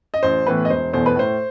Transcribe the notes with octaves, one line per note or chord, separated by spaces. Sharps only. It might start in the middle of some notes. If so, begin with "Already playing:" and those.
D#5
A1 C5
A2 E3 B3 B4
D#5
E1 C5
E2 B2 A3 C5
B4
A2 C5